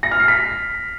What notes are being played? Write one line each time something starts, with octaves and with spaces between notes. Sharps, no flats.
A#6
F6
C7
B6